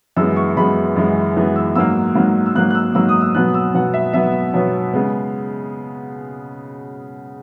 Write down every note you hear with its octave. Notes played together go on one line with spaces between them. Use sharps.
F#2 E3 G#3 B3 E6
C#6
F#2 E3 G#3 B3 B5
F#2 E3 G#3 B3
F#2 E3 G#3 B3
E6
G#2 F#3 A#3 E6
G#2 F#3 A#3
E6
G#2 F#3 A#3 F#6
F#6
E6
G#2 F#3 A#3 E6
D#6
E6
B2 F#3 B3 F#6
E6
B2 F#3 B3 F#5
E5
B2 F#3 B3 E5
B2 F#3 B3 C#5
C#3 G#3 B3